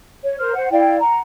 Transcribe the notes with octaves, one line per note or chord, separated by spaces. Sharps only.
C#5
A#4 C5 F6
C5 F#5
E4 D5 F5 G5
F#5 A#5